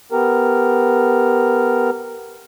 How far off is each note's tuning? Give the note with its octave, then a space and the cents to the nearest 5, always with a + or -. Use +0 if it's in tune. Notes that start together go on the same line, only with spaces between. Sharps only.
B3 +0 G4 +0 A#4 -5